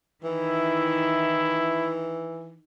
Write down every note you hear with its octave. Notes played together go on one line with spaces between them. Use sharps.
D#3 E3 E4